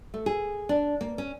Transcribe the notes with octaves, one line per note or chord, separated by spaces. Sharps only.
A3
G#4
D4
A#3
C#4